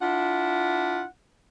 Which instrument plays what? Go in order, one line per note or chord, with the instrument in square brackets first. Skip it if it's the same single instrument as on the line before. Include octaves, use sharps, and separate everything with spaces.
[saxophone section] D4 E4 F4 F#5